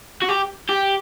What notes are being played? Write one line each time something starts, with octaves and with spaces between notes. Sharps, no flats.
F#4
G4
G4